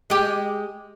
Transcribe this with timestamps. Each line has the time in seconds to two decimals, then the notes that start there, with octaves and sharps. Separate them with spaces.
0.10 G#3 G4